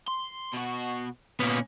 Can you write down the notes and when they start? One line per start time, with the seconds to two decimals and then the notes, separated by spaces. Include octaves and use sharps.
0.08 C6
0.54 B2 F#4
1.40 A#2 B3 C#4